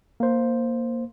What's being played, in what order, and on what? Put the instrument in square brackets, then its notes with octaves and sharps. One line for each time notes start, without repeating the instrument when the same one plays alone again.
[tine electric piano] A#3 C5